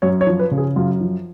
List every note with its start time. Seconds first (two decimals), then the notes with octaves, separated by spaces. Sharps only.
0.02 F#2 C#5
0.21 C#5
0.27 F3
0.39 B4
0.51 C#3
0.58 G#4
0.76 F#2 F4
1.00 F3